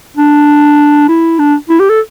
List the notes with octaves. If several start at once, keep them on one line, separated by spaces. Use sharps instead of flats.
D4
E4
D4
E4
G4
A4